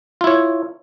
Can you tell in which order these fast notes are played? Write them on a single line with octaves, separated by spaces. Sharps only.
F4 E4 C#5